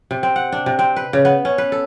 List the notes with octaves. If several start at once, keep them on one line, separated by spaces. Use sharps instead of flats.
C3
C4
F#5
D4
C3
C4
B4
C#3
B3
C#4
B4
A4